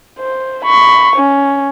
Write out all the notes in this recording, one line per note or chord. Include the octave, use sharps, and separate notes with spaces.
C5
B5 C#6
C#4